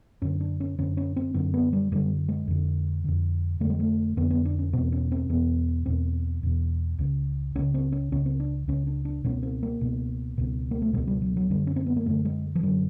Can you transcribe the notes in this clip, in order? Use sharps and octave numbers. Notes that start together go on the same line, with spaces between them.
F#2 D3 C#4
D4
C#4
F#2 D3 C#4
C#4
C4
F#2 D3 C4
B3
G3
F#2 D3 G3
G#3
F2 D3
F2 D3
F2 D3 A3
G#3
A3
F2 D3 B3
B3
D4
C#4
E2 B2 C4
C#4
C4
E2 B2 B3
E2 B2 C4
E2 B2
C#2 C#3
C#2 C#3 C#4
C4
C#4
C#2 C#3 C#4
C4
D4
C#2 C#3 C#4
D4
D4
C#2 B2 C#4
C4
A#3
C#2 B2
C#2 B2
A#3
A3
C#2 B2 G#3
G3
F#3
F#3
F#2 D3 G3
C#4
C4
B3
A#3
F#2 D3 A3
G#3
F3
F#2 D3 F#3